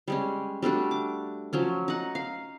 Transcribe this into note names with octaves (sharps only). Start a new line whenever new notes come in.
G3 G#3 C#4
G3 A3 D4 F#4
D6
F3 F#3 C#4
D#4 F#5
F5